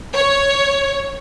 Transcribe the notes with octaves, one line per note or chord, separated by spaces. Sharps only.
C#5